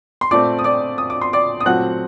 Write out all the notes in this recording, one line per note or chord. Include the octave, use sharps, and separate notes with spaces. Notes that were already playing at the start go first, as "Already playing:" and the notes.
C6
A#2 A3 C4 D5 D6
D#6
D5 D6
D#6
D6
C6
D5 D6
D#6
A#2 F#3 A3 C4 F#5 F#6